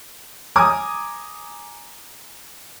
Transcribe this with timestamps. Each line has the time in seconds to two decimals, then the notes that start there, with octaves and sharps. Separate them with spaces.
0.56 G#5 A#5 D6 D#6